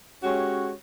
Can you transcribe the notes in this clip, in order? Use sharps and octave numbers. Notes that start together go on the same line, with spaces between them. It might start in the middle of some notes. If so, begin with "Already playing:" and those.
G#3 C#4 F#4 G4 C#5